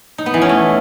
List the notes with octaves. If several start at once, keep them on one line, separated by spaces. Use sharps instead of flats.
D#4
B3
E3
C#4
A3